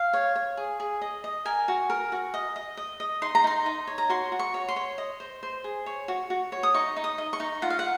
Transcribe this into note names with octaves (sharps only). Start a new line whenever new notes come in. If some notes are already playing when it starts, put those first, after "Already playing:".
Already playing: F5
C#5
C#5
G#4
G#4
D#5
D#5
A#4 G#5
F#4
A#4
F#4
D#5
D#5
D#5
D#5
D#4 C6
A#5
D#4 C6
D#4
C#5
A#5
F#4 C6
F#4
C#6
C#5
C6
C#5
D#5
C5
C5
G#4
C#5
F#4
F#4
C#5
D#6
D#4 C#6
D#4
D#6
D#5
C#6
D#4
F4 F#5
F5
F#5